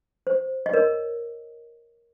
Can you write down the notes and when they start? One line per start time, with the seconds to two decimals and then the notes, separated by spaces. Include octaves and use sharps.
0.27 C5
0.66 D#5
0.73 A#4 C#5